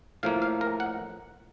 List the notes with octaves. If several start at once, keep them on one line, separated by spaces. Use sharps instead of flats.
A2 F3 A#3 F5
F5
A#4
F#5